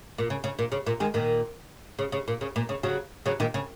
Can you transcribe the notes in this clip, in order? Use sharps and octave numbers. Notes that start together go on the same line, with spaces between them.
A#2
C#3
C#3
A#2
C#3
A#2
D#3 G#3
A#2 D#3
C#3
C#3
A#2
C#3
A#2
C#3
C#3 F#3
C#3 F#3
A#2 D#3
C#3